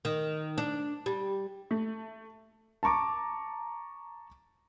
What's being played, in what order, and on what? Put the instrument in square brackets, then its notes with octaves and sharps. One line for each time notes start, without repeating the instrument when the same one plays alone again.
[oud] D#3
D4
G3
[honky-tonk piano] A3
[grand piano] A5 A#5 C#6 D6